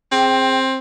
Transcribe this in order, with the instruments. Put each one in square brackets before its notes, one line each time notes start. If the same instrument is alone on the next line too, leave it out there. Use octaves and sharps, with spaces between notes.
[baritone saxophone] C4 [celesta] G#4 G5